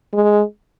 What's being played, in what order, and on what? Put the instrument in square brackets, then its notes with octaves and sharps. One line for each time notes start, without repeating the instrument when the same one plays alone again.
[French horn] G#3